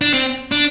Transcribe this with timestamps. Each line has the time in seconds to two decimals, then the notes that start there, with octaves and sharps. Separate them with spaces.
0.01 D4
0.13 C4
0.52 D4